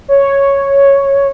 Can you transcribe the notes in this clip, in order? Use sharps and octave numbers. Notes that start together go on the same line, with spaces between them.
C#5